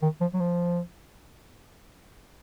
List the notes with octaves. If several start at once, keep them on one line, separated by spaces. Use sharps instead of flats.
D#3
F3
F#3
F3